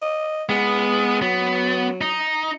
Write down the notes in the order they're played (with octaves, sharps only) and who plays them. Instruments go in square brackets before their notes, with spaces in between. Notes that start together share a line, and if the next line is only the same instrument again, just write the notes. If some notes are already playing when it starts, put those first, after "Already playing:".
[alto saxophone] D#5
[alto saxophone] G#3 [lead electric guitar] B3
[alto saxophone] F#3 [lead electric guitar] B3
[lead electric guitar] D#4